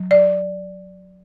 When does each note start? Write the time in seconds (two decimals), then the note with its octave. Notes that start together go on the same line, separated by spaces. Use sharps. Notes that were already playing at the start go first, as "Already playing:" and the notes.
Already playing: F#3
0.11 D5